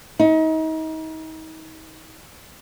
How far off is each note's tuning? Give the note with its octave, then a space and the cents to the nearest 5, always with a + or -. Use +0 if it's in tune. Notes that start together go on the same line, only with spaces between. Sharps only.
D#4 +35